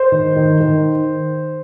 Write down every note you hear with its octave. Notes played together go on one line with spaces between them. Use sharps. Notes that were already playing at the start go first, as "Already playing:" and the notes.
Already playing: C5
D#3
D#3
D#3